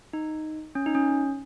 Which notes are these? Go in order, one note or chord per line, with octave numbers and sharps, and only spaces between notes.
D#4
C#4
D#4
C#4